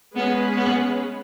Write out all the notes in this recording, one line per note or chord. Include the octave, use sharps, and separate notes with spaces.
G#3 B3 C#4 G#4 B4
B3